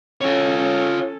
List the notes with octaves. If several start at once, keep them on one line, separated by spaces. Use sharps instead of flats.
C#4 F4 A4 C#5